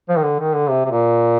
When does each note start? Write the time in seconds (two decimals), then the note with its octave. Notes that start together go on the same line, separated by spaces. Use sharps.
0.09 F3
0.17 D#3
0.23 D3
0.39 D#3
0.54 D3
0.69 C3
0.86 C3
0.91 A#2